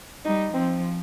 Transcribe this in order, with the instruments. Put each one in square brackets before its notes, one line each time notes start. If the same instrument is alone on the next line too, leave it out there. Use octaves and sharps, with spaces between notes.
[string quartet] G3 [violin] D#4
[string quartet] F3 [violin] C4